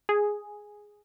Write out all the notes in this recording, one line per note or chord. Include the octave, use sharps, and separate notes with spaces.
G#4